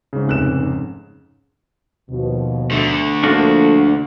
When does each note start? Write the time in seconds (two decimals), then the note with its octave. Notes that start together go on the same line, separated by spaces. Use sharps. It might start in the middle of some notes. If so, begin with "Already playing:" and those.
0.13 G#2 C#3
0.28 F1 F#6 E7
2.10 D#2 B2 F3
2.71 D3 A3
3.23 F3 A#3 D4 F4 F#4 A4